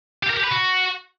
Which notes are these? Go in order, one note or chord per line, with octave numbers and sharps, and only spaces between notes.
G4
A#4
G4
B4
F#4